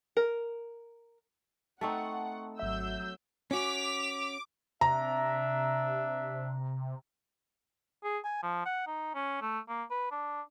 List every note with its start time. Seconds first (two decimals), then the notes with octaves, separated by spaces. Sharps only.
0.17 A#4
1.81 A3 C4 D#4 F#5 A5 C#6
2.59 G#1 F#3 E5 E6 G6
3.51 C#4 F#4 D6 B6 F7
4.81 C3 D4 E5 A#5
8.04 G#4
8.25 G#5
8.43 F3
8.66 F#5
8.87 D#4
9.15 C#4
9.42 A3
9.69 A#3
9.91 B4
10.11 D4